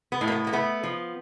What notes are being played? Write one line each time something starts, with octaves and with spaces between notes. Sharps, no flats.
B3
A2
A#3
B3
A#3
A3 B3
F3